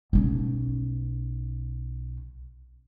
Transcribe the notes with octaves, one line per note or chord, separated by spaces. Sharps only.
B1 C#4